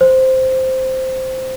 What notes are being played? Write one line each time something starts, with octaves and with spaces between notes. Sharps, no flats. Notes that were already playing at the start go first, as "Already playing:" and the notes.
C5